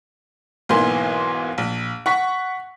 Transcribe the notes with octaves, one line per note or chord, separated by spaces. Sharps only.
B1 G#2 E3 A#3 C6
A#1
F#5 C#6 B6